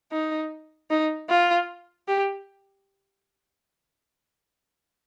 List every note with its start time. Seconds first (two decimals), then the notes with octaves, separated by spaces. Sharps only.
0.12 D#4
0.90 D#4
1.30 F4
2.08 G4